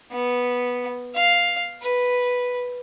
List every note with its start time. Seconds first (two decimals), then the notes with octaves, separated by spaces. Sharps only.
0.12 B3
1.15 F5
1.82 B4